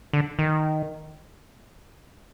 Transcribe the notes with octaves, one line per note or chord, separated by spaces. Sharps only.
D3
D#3